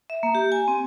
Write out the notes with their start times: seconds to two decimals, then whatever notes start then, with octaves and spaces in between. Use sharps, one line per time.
0.10 E5
0.23 A#3
0.35 G4
0.52 G#5
0.68 C4